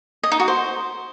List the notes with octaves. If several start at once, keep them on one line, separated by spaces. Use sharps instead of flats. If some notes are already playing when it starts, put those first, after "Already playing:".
D#5
D#4
F#4
C5